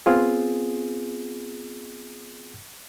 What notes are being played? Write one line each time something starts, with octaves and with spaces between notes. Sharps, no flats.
B3 C4 F4 G#4